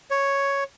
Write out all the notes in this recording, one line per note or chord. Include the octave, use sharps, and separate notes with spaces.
C#5